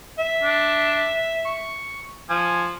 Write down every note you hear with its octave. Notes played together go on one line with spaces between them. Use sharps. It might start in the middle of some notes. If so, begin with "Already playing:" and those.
E5
D4
C#6
F3 G#5